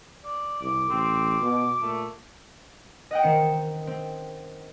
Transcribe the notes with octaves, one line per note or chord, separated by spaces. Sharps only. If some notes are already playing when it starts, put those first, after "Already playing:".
D5
C2 D6
A1 C4
B2
A#2 A3
D#5 F#5 G5
D#3 C4 C#7 E7
C4